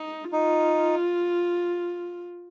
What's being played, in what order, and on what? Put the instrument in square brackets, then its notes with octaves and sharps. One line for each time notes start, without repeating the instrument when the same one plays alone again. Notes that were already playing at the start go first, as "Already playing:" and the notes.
Already playing: [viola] D#4
[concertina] D#4 [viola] F4